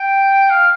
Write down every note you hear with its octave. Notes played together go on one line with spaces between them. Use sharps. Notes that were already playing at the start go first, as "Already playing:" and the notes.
Already playing: G5
F5